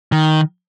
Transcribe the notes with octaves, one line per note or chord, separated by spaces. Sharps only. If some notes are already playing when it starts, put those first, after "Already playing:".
D#3